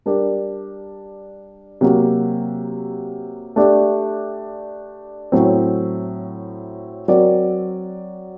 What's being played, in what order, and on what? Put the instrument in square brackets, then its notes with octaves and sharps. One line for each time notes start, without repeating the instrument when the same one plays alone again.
[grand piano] G3 D4 G4 A#4 D5
C3 F#3 A#3 F#4
A3 D4 G4 D5
A2 F#3 C4
F#3 C4 F#4 A#4 D5